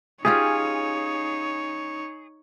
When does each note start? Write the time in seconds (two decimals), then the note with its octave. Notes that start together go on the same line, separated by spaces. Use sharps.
0.25 C#4 D#4 F4 G4 G#4 C#5